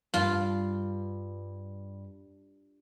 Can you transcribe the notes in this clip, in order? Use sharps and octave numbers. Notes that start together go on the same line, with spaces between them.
G2 F4